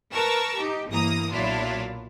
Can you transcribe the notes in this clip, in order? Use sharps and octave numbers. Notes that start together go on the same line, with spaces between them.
A#4 B4 A5 A#5 C#6 E6
D#4 G4
G1 E3 A#3 A#5 D#6
B1 A#2 F#3 D4 E4 F4